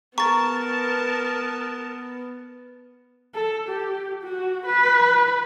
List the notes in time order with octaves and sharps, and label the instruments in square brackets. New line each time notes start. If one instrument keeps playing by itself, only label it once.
[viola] B3 [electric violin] A#4 A5 [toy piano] A#5 [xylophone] C#6 A6
[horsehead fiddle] A4
G4
F#4
B4